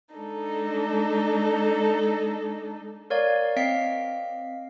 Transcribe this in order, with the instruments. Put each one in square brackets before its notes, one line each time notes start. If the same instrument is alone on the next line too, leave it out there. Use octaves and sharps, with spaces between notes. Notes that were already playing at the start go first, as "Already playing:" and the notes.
[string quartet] G#3 D4 D#4 A4
[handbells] A#4 C#5 D5 F5
C4 D#5 F5 B6 C7 D7